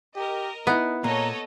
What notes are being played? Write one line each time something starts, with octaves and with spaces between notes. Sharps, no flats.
G4 A#4 D#5
B3 D#4 E4 B4
A#2 A#3 A4 C#5 D#5 A#5